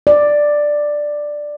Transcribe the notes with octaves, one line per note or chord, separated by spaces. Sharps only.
D5